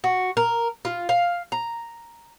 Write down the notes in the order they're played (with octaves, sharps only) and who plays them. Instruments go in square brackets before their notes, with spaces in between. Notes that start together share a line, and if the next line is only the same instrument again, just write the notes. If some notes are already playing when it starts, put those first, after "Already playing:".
[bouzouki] F#4
A#4
F4
F5
A#5